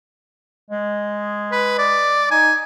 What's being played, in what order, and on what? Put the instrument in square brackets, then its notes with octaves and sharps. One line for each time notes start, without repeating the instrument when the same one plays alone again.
[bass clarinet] G#3
[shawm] B4
D5
[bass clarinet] D#4 [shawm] G#5